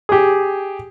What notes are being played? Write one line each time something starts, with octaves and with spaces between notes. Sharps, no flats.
G4 G#4